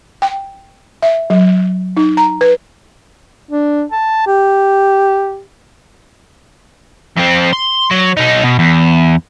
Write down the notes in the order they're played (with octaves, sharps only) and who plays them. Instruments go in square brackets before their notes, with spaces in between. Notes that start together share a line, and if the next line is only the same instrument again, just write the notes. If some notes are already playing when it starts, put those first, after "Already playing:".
[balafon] G5
E5
F#3
D#4
A#5
B4
[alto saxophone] D4
A5
G4
[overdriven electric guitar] F2 C4
C6
F#3
B2 D#4
B2
E2